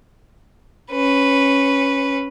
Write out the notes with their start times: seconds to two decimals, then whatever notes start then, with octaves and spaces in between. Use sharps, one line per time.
0.91 C#4 B4